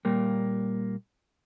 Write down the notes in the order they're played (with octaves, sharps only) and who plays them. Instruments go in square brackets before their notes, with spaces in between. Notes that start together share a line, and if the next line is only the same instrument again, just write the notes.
[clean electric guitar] A#2 G3 A#3